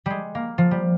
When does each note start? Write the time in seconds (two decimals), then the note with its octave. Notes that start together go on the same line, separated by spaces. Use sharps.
0.06 G3 G#3
0.35 A#3
0.58 F3
0.71 G3